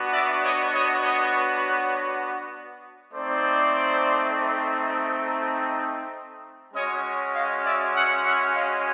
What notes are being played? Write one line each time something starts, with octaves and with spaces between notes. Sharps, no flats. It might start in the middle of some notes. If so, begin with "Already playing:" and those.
Already playing: B3 D4 F#4
D5 E5
C#5 D#5
C#5 D#5
C#5 D#5
B4 C#5
A3 C4 D#4 C5 D5
G#3 C#4 F#4 C#5 D#5
D#5 F5
D5 E5
E5 F#5
E5 F#5
D#5 F5